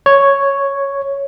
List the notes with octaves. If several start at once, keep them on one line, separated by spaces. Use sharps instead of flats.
C#5